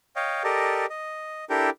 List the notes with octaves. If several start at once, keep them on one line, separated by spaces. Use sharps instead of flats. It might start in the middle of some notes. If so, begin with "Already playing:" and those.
C#5 D#5 F5 G5
G4 A4 A#4 D5 D#5
D#5
D4 E4 G4 A4 A#4 G5